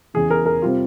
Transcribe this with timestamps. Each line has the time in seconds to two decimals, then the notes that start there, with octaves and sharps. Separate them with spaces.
0.14 E2 C#3 E3 G#4
0.30 A#4
0.46 A#4
0.62 C3 G3 C4 F4